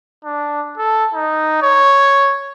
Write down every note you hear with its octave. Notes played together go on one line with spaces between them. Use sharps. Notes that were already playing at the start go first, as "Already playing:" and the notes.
D4
A4
D#4
C#5